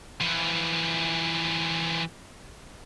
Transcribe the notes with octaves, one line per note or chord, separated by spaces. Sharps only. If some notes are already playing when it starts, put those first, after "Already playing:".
E3 F3